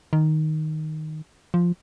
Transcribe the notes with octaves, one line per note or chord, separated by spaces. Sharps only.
D#3
F3